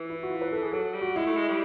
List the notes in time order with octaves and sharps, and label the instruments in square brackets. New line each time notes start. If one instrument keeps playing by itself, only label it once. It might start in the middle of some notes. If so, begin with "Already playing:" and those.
Already playing: [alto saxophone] E3
[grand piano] E4
F#4
F4
B4
A4
G#4
[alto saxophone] F#3 [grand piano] A4
[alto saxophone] G3
[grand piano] F#4
[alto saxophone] G#3 [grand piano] E4
[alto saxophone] A3
G#3
G3